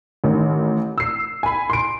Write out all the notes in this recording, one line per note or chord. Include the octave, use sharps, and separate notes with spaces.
A1 D#3
E6 C7
G#5 B5
C6 D7